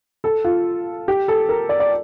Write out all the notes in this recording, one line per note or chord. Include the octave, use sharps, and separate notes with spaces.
A4
F4
G4
A4
A#4
D5
D5